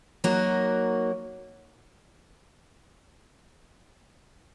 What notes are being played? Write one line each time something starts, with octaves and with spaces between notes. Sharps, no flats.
F#3 A#3 D#4 F#4 A#4